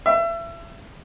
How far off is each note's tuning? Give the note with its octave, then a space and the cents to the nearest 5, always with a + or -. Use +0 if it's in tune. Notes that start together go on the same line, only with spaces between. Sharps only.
E5 +30